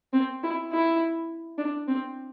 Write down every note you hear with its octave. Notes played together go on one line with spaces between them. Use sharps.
C4
E4
E4
D4
C4